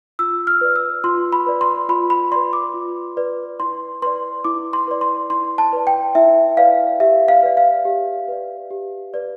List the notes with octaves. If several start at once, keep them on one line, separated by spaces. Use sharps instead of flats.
F4 E6
F6
B4 D5
E6
F4 C6
B5
B4 D5
C6
F4 B5
B5
B4 D5 C6
D6
F4
B4 D5
E4 C6
B4 D5 C6
E4 D6
C6
B4 D5
C6
E4 C6
A5
B4 D5
G5
E4 E5
B4 D5 F5
G4 E5
F5
B4 D5
F5
G4
B4 D5
G4
B4 D5